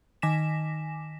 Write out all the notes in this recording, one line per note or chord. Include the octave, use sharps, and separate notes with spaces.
D#3 G#5 D6 A#6 B6 E7